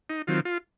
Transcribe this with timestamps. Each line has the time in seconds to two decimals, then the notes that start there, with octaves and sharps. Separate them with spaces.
0.10 D#4
0.27 D#3 F#3 C4 F4
0.45 F4